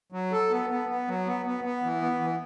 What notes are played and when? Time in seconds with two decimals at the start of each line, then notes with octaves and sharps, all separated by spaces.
0.12 F#3
0.32 A4
0.50 B3
0.70 B3
0.89 B3
1.08 F#3
1.26 B3
1.46 B3
1.64 B3
1.83 E3
2.02 B3
2.21 E3